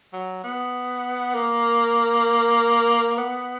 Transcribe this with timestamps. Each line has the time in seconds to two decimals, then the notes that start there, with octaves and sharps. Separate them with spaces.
0.13 F#3
0.44 B3
1.35 A#3
3.18 B3